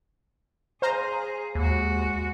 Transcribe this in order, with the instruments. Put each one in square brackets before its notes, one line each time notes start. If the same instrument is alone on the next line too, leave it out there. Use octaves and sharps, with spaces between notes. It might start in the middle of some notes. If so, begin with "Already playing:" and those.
[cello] G#4 [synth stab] C5 F5 A#5
[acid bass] D#2 [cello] G#3 F#4